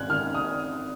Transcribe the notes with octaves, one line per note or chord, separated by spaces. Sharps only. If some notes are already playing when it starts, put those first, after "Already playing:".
Already playing: G#1 F#6 G#6
D#3 F6
D#6